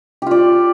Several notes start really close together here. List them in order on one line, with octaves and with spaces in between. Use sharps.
G4 F4 D5